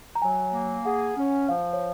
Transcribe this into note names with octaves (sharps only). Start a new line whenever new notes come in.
A#5
F#3 G#5
A#3
G#4 F#5
C#4
F3 F5
C#5